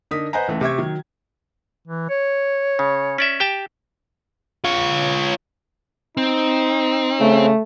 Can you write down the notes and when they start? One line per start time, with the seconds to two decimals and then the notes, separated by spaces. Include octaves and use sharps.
0.11 D3 D#4 A#4 D#6 B6
0.33 B4 C5 D#5 F#5 G#5 A#5
0.48 C#2 E3 A3
0.61 C3 E5 C#6 G#6
0.78 D#3 F#3
1.88 E3
2.10 C#5
2.79 C#3
3.18 C#4 D5 E5
3.40 G4 G5 A5
4.64 F4 C#5
6.17 C4 D#4
7.20 C#3 A3